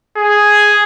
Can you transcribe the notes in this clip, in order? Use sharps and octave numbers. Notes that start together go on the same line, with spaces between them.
G#4